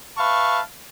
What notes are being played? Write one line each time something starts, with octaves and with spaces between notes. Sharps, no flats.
B4 E5 F5 A5 C#6